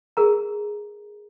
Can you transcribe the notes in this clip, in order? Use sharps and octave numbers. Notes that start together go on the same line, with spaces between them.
G#4 A#4 A#5